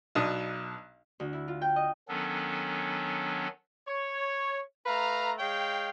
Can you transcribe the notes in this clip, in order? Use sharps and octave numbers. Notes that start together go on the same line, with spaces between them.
B1 B2 D4 D#6
D2
E4
F4
G5
D#5
D#3 F#3 B3 C#4 D4 A4
C#5
A3 B4 F5 A#5
G#3 C#5 F5 G5